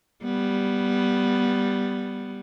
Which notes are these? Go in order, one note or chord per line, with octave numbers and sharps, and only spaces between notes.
G3 B3